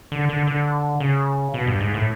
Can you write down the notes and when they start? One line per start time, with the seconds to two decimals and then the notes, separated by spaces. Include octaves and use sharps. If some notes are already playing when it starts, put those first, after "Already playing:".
0.12 D3
0.29 D3
0.47 D3
1.00 C#3
1.54 B2
1.67 G2
1.81 G#2
1.94 A2